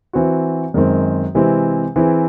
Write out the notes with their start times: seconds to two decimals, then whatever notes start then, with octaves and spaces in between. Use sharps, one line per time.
0.13 E3 C4 F#4
0.74 F#2 D#3 G#3 C4
1.35 C3 E3 G#3 C4 E4
1.96 E3 C4 E4 G#4